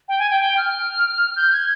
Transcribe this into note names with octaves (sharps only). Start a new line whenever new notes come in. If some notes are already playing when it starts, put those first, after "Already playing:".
G5
G#5
G5
G5
F6
G6
G#6